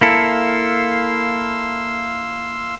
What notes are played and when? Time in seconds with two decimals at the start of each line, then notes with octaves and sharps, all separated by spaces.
0.01 A#3 E4 A4 F5 C6 E6